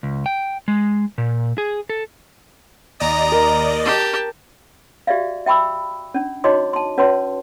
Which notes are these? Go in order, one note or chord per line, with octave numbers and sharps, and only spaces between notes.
C#2
G5
G#3
A#2
G#4
A4
D#2 D5 D#5 A#5
A#4
G4 A5
F#4 G4 D5 E5 F5
E5 G5 B5 C#6 E6
C#4 D4
D#4 F#4 C#5 D#5 C6 D6
A5 C6
C#4 F#4 B4 C#5 A5 C6